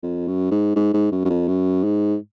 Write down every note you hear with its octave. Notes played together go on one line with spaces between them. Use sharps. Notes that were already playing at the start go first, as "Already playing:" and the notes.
F2
F#2
G#2
G#2
G#2
F#2
F#2
F2
F#2
G#2